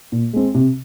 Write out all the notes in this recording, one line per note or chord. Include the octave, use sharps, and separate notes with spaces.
A#2
G#3 C4
C3